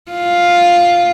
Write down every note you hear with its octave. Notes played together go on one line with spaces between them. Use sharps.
F4